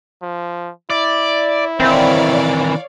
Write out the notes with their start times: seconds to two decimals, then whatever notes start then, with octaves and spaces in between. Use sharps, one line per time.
0.22 F3
0.90 E4 D5
1.80 D#3 E3 C4 C#5 D5 F5